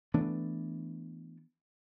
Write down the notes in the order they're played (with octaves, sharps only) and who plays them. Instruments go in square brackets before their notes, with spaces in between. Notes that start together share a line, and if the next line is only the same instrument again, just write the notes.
[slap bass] E3 A3 B3 D4